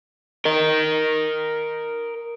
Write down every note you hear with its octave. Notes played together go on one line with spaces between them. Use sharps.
A#4 D#5